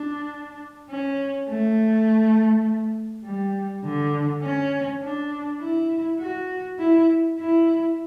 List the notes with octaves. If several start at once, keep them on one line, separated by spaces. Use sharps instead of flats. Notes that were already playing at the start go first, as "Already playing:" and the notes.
Already playing: D4
C#4
A3
G3
D3
C#4
D4
E4
F#4
E4
E4